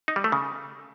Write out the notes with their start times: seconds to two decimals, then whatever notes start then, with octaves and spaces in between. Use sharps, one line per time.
0.08 D#4
0.16 G3
0.24 A3
0.32 C#3